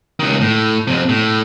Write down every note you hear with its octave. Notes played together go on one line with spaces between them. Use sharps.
C#2 D#3
A2
F2 C3
A2